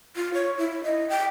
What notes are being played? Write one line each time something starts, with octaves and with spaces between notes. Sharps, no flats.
F4
C#5
E4
D#5
G5